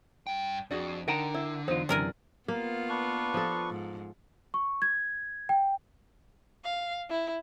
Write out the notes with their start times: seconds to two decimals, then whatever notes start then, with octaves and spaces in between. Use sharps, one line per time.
0.27 G2 G5
0.71 F2 D4 F#4 G#4
1.08 D3 D#4 A#4 F#5 G5 A5 A#5
1.34 E4
1.68 E2 F#3 D#4 F4 C5
1.89 F#2 C3 E3 D4 A#4 G#5
2.48 A#3 B3 F4
2.89 D4 B4 C#6
3.34 F3 A4
3.71 G#2
4.54 C#6
4.82 G#6
5.49 G5
6.64 F5
7.09 E4